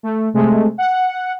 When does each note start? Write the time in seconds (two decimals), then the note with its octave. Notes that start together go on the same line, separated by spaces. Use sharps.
0.03 A3
0.34 C3 G#3 A3
0.78 F#5